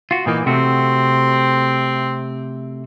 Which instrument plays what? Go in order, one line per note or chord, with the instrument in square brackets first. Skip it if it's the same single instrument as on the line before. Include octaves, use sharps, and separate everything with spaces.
[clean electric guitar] F4 F#4
[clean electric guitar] A#2 E3 A#3 [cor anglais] D#4
[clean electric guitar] C3 A3 F#4 [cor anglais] C4